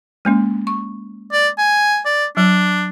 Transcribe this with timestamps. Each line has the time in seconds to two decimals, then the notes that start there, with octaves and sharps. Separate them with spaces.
0.25 G#3 A#3 C#4
0.67 C#6
1.32 D5
1.58 G#5
2.06 D5
2.37 F#3 D4